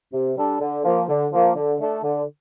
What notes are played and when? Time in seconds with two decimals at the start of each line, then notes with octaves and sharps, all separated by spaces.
0.13 C3
0.37 G3 D4 A4
0.61 D3
0.84 F3 A#3
1.08 D3
1.32 F3 A#3
1.56 D3
1.80 A3 D4 A4
2.04 D3